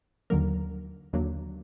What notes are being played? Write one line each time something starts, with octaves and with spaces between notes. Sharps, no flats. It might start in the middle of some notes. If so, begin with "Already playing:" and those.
D#2 D3 F#3 A#3 A#4
D#2 D3 F#3 A#3